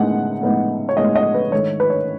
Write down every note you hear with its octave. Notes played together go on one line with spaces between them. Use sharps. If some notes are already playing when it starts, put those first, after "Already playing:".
Already playing: A2 G#3 B3 D#4 F#5
A2 G#3 B3 D#4
C#5
A2 G#3 B3 D#4 D#5
D#5
B4
G#2 D#3 A3 D#4 C#5
B4
C#5